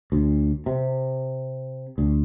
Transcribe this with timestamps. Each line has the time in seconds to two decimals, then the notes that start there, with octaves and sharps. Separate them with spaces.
0.12 D2
0.66 C3
1.98 D2